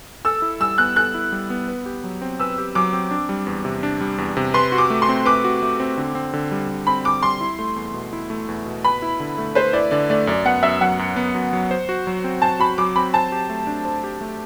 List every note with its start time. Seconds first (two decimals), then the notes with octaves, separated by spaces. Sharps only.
0.25 A4 E6
0.42 E4
0.60 G3 E6
0.78 B3 F#6
0.96 A4 F#6
1.14 E4
1.32 G3
1.50 B3
1.68 B4
1.86 G4
2.04 F#3
2.22 C4
2.40 B4 E6
2.58 G4
2.75 F#3 D6
2.93 C4
3.11 D4
3.29 G3
3.47 E2
3.65 C3
3.83 D4
4.01 G3
4.18 E2
4.37 C3
4.54 B4 C6
4.72 F#4
4.78 D6
4.90 A3
5.02 C6
5.09 C4
5.25 B4 D6
5.44 F#4
5.62 A3
5.80 C4
5.97 D3
6.15 C4
6.33 D3
6.51 G3
6.69 D3
6.87 C4 B5
7.05 D3 D6
7.23 G3 C6
7.41 E4
7.59 A3
7.76 E2
7.94 B2
8.13 E4
8.30 A3
8.49 E2
8.66 B2
8.84 B4 B5
9.02 E4
9.20 D3
9.38 A3
9.55 B4 C5
9.73 E4 D5
9.91 D3 D5
10.10 A3 D5
10.27 F#2 D5
10.45 B3 F#5
10.63 F#2 E5
10.81 F#3 F#5
10.99 F#2
11.16 B3
11.35 F#2
11.53 F#3
11.71 C5
11.89 F#4
12.07 F#3
12.24 C4
12.42 C5 A5
12.60 F#4 B5
12.78 F#3 D6
12.96 C4 B5
13.14 C5 A5
13.32 G4
13.50 A3
13.67 D4
13.85 C5
14.04 G4
14.21 A3